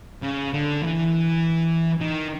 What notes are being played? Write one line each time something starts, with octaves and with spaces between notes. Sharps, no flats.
C#3
D3
E3
D#3